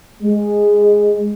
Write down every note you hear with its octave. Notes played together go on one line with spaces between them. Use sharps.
G#3